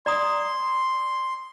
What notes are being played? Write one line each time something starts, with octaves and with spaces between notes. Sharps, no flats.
D5 A#5 C6 D#6